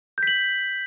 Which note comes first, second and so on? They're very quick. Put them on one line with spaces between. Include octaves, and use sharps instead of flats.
G6 B6 F#7